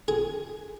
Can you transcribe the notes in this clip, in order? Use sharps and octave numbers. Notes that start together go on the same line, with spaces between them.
G#4